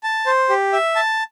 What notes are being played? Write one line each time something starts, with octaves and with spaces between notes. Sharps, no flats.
A5
C5
G4
E5
A5